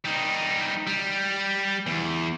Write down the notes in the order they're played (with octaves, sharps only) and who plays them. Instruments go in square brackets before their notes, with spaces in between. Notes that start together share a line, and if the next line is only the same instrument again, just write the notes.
[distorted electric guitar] G3 D#4
G3
E2